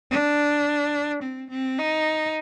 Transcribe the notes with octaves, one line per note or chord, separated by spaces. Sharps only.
D4
C4
C4
D#4